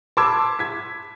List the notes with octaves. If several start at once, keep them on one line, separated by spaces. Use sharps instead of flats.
A5 B5 C6 D6 E6 G#6
G#6 B6